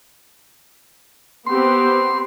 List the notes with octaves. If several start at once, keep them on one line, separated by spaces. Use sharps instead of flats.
B3 C4 G4 C6